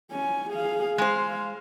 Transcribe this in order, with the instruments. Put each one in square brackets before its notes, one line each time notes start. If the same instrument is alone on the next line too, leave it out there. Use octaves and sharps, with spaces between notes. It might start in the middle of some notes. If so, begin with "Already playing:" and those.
[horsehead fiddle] C#4 G#5
G#4 F5
[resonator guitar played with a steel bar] G#3 C5 [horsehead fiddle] F5